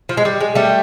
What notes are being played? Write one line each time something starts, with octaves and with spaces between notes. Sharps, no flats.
F3
G#3
G3
G#3
G3 A3